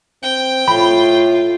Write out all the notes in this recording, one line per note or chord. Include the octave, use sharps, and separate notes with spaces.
C4 G5
A2 F4 B5